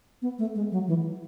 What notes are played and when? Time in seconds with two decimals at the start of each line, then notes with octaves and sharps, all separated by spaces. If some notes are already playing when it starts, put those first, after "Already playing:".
0.22 B3
0.38 A3
0.55 G#3
0.71 F#3
0.87 E3